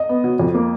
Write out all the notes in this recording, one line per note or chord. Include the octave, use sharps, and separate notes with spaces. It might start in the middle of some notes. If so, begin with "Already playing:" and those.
Already playing: D#5
B3
F#3
F2
A#3